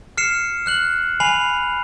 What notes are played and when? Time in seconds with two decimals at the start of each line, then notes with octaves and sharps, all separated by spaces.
0.17 F6 C7 C#7 E7
0.66 F6 F#6 F#7
1.20 G#5 B5 C7 F7